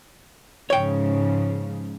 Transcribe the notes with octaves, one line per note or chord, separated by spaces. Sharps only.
G#2 C#3 F3 C#5 G5